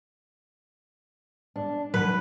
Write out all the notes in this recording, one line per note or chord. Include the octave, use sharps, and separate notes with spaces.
D4
F#3 B4